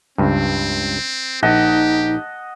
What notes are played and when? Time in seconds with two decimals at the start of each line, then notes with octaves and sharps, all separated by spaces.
0.18 C#2 G2 C4
1.43 A#1 D#4 G4 D#5 F#5 A5